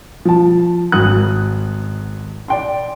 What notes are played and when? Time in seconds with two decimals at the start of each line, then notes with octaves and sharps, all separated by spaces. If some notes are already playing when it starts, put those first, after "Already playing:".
0.25 F3 A5
0.92 G#1 F#4 D#6 F#6
2.48 D5 G5 C6